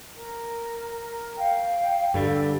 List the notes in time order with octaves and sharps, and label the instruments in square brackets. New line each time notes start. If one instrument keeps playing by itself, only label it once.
[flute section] A#4
F5 G5
[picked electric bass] G2 D3 G3 [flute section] A4